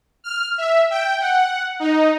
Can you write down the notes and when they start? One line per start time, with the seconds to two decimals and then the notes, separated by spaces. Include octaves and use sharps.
0.24 F6
0.58 E5
0.90 G5
1.20 F#5
1.80 D#4